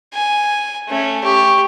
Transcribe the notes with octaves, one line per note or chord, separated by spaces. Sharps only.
G#5
A3 C#4
G4 C#6